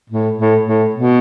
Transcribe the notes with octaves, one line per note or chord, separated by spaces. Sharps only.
A2
A2
A2
B2